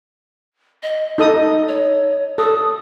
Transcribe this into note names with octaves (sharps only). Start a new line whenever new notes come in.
D#5
D#4 A4 D#5 D#6
C#5
A4 D#6